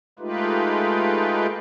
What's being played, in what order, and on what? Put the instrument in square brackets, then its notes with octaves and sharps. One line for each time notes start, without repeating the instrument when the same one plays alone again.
[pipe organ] G#3 A3 D#4 F4 G4 B4